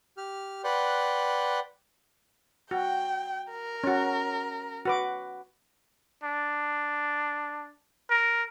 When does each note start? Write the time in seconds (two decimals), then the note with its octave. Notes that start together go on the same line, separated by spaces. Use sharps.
0.17 G4 F6
0.64 B4 D5 F#5 G5 C6 F#6
2.71 F#4 G5
3.51 A#4
3.84 C#4 F#4
4.85 F#4 B4 D6
6.24 D4
8.10 A#4